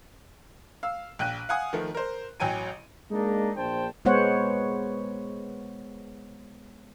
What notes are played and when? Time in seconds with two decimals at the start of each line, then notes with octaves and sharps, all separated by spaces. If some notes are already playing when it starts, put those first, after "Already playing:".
0.83 F5 E6
1.19 A#1 G5 F#6 D#7
1.49 F5 F#5 G#5 D#6
1.73 D#3 F3 A3
1.95 A#4 C5
2.40 A1 F#3 G5 G#5 D#7
3.11 G#3 A#3 D4 D#4
3.56 A#1 D4 C5 G5 A5
4.05 G#3 B3 C5 C#5 F#5